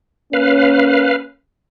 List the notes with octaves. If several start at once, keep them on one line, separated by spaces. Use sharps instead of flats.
A#3 C#4 B4 F5